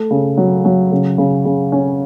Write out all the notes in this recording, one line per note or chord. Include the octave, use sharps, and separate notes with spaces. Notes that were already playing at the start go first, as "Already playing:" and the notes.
Already playing: A3
C#3
F#3
F#3
C#3
C#3
C#3
C#4